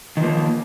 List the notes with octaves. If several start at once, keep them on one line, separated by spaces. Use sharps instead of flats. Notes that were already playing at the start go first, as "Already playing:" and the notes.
D#3 F3 A#3